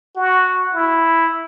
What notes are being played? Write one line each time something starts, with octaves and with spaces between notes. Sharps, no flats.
F#4
E4